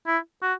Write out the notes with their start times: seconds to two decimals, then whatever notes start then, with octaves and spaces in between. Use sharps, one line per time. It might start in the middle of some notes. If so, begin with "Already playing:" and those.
0.07 E4
0.43 F#4